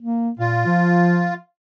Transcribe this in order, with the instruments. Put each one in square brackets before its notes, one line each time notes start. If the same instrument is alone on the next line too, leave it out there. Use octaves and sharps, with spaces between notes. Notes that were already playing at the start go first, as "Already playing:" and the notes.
[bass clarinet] A#3
[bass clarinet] A#2 [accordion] F4
[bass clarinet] F3